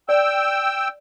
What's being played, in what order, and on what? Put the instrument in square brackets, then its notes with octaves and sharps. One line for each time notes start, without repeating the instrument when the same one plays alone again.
[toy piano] D5 [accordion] G5 E6